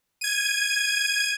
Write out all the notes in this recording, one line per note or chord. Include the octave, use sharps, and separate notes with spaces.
G#6 D#7